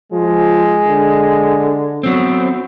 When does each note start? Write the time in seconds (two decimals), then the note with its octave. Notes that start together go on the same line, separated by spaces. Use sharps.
0.12 F3 G#3
0.86 D3
2.03 F#3 B3 C4